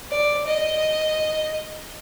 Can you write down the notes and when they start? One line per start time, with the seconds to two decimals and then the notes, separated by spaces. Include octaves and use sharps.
0.11 D5
0.47 D#5